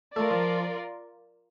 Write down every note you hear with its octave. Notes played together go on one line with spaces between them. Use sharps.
A3 F4 A#4 D5
F3